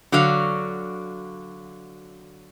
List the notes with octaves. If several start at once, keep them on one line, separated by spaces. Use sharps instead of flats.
D3 F#3 F#4 F5